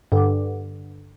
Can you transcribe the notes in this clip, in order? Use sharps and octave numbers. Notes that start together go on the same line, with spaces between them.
G2 D3